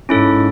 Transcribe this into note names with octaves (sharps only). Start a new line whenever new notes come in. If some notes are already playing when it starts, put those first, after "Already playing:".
G#2 C#4 E4 A4